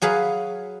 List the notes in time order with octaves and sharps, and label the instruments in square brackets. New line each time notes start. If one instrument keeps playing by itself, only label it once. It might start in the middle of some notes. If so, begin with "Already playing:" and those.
[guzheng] F#3 G#4 B4 F5